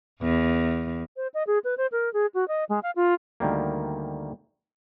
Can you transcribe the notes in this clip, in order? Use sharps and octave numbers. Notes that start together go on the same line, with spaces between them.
E2
C5
D#5
G#4
B4
C5
A#4
G#4
F#4
D#5
G#3
F5
F4
D2 D#3 G3 A#3